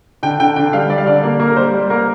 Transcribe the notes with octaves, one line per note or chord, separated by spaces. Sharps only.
D3 G5
D3 G5
D3 G5
G3 F5
G3 D5
F5
D3 D5
A#3
A#3
A#4
G3 C5
G3
A#3 A#4